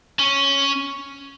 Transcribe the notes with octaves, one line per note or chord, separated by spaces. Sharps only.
C#4